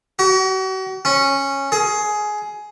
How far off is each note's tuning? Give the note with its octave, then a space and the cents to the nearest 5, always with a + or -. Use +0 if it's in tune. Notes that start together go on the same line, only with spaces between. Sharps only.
F#4 +40
C#4 -10
G#4 +15